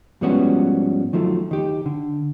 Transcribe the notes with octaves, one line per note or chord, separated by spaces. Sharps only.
G#2 F3 G3 B3 C#4 F#4
D#3 F3 F#3 A3
D#3 G4
D3